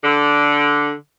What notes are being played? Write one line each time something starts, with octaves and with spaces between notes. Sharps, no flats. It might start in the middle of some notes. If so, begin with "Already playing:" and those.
D3